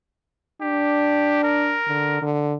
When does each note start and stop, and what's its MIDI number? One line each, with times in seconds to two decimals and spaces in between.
0.61 1.77 62
0.61 1.42 67
1.43 2.24 70
1.88 2.20 50
2.22 2.56 50